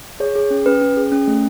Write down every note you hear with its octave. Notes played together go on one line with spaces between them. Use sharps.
G#4 C#5
G#4
C#4
C#4 B4
C#4
G#4
C#4
A3